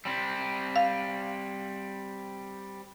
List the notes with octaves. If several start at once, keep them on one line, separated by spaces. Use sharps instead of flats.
G3 C4
F5